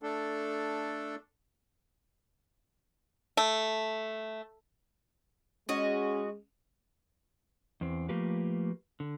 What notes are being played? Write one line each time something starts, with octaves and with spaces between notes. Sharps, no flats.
A3 D4 A4
A3
G#3 C#4 F#4 D#5
E2 C4
F3 A3 A#3 F4 G4 B4
D3